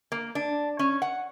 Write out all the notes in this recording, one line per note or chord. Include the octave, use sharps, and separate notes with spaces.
A#3
D4
C#4
F#5